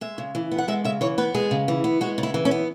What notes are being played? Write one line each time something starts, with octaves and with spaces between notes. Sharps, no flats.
G#3 E5
C#3
E3
B3
F#5
G#3 E5
C#3 E5
E3 C#5
B3 B4
G#3 G#4
C#3
E3
B3
G#3 F#4
C#3
E4
E3
C#4
B3